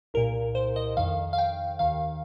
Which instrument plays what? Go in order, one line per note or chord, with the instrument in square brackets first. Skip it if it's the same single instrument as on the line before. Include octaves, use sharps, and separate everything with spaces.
[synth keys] C2 A#2 A#4
C5
D#5
F2 D#3 F5
F5
G5
D#2 D#3 F5